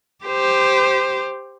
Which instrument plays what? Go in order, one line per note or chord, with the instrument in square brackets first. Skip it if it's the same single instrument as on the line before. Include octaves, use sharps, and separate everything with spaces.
[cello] G4 C5